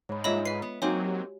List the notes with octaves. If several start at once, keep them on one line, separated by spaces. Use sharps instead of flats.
G#2 C#5 B5
G2 G#3 A#3 F4 C#5 D#5 E5 B5
B4 E5 C7
B3
F#3 A#3 C4 D#4 F#4 C#5 G#5
G4